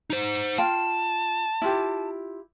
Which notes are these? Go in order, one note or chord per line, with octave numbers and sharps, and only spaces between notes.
D#4 C5
F4 F5 G5 A5
E4 F4 G4